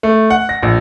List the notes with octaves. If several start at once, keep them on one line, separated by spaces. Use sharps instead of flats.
A3
F#5
A#6
A#1